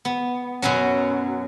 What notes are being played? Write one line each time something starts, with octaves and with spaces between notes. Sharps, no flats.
B3
F#2 B2 F#3 C#4